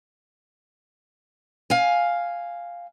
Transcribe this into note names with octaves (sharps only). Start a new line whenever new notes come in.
F5 G#5